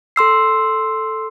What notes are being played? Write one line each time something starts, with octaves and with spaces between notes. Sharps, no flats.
A4 C6 E6 C7